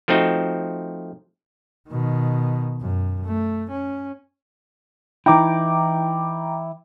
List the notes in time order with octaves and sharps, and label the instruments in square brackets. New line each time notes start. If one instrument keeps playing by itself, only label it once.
[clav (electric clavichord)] F3 A3 C4 D#4 F#4
[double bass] B2 D#3
F#2
A3
C#4
[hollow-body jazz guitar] E3 D#4 E4 [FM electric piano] G5 A#5 D6